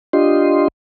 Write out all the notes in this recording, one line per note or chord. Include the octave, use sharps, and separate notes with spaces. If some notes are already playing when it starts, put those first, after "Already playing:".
D4 F4 G4 D#5 C6